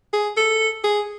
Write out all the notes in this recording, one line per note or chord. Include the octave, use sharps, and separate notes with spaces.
G#4
A4
G#4